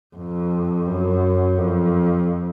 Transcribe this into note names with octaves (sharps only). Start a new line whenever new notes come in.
F2
F#2
F2